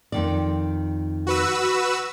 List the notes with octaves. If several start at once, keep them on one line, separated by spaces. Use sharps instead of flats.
F2 D#3 D5
F#4 B4 E6